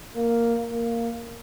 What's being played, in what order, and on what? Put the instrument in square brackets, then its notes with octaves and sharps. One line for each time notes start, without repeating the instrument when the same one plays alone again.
[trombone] A#3
A#3